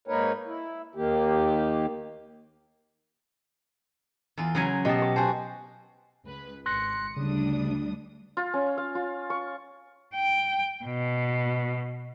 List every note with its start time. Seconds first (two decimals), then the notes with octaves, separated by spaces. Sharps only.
0.08 G#2 A#3 D#4 A#4 B4 C#5
0.46 E4
0.95 D#2 D#3 A#3 G4
4.37 E2 F4
4.55 C#3 F#3 G#5 A#5
4.85 B2 G4 D#5 A5
5.02 D6
5.16 F#4 C5 G#5 A5
6.26 C#2 B4
6.66 G#1 C6 F#6 A#6 C#7
7.17 D2 C#3 G3 D4 D#6
8.37 F4
8.54 C#4
8.78 F5
8.95 F4
9.30 C#6
10.15 G5
10.85 B2